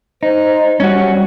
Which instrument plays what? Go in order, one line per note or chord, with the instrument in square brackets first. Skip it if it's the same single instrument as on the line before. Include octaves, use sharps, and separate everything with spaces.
[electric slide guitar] D#4 [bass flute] C5
[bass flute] G3 [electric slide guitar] C#4 F#4